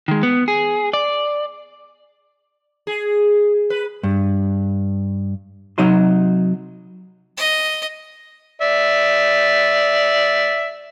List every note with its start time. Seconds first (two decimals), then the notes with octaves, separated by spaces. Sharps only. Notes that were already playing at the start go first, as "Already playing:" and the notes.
0.08 D#3 G#3
0.23 B3
0.48 G#4
0.93 D5
2.87 G#4
3.70 B4
4.03 G2
5.78 C3 F#3 D#4 D#5 C6
7.37 D#5
8.61 D5 E5